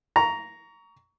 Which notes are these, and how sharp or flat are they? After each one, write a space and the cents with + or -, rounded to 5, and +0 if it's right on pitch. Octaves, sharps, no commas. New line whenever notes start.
A#5 +0 C#6 +25